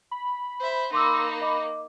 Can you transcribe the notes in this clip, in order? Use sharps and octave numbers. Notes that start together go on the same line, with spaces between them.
B5
C5 E5
A#3 D#4 C6 D6 E6
D#5 D6